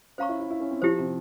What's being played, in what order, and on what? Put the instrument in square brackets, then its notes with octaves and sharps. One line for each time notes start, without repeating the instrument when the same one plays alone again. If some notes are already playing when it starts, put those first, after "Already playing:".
[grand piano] C#4 [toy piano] C5 F5 A#5 C#6
[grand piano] E4
E4
E4
C#4
C4
[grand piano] F3 [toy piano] E4 G4 C5
[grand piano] C3